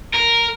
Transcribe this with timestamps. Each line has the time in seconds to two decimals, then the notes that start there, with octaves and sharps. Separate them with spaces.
0.14 A#4